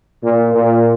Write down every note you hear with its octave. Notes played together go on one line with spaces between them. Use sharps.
A#2
A#2